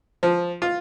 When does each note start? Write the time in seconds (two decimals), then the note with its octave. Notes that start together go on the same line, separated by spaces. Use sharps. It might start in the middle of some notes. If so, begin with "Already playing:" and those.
0.23 F3
0.62 F4